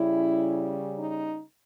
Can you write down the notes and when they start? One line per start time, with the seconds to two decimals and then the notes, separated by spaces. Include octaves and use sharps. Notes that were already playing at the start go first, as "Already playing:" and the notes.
Already playing: C#3 G3 C#4 E4
0.97 D#4